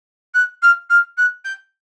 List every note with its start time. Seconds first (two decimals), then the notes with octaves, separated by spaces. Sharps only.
0.34 F#6
0.62 F6
0.90 F6
1.17 F#6
1.45 G6